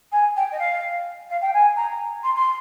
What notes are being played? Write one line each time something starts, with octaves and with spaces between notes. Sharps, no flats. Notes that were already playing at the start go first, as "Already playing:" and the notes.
G#5
G5
D#5
F5
F5
G5
G#5
A#5
C6
C6